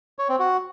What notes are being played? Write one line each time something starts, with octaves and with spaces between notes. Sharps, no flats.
C#5
C4
F#4